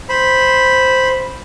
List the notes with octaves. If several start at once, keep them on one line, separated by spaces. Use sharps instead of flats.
C5 B5